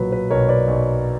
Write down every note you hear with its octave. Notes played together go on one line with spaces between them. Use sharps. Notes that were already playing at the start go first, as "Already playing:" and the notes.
Already playing: B1 A#2 F#3 B4
B4
B1 A#4 C#5
B4 D5
B1